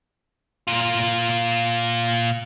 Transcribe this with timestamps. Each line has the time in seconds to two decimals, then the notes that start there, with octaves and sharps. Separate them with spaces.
0.68 A#2 F4